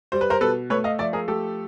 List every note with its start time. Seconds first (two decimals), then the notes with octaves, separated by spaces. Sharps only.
0.12 G3 C5
0.21 B4
0.30 A#4 C5
0.41 B2 A4 B4
0.70 A3 B4 C#5
0.84 D#5 F5
0.99 F3 D5 E5
1.13 G#4 A#4
1.28 A3 G4 A4